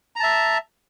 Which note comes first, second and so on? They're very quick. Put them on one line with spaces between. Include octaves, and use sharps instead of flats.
A#5 A5 E5